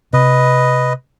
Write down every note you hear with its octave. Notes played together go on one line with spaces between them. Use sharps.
C3 B4 D#5